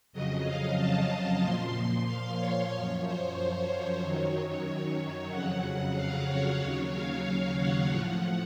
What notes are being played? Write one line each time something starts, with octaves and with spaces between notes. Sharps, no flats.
F2 C#3 F#3 D#5
F5
A5
A#2 F3 C6
F5
C#5
F#2 F3
C5
C5
F#2 D#3 F#3 C#5
F2 C#3 F#3 F#5
F5
C#5
D#2 C#3 F#3
F5
F#5
A2 F3